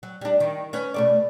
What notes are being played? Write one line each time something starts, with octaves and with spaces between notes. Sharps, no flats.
F#3
G3 D4
D#3
C#4 B4 C#5
B2 A3 D5